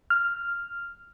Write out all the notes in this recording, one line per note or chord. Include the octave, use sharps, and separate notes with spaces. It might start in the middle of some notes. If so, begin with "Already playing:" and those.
F6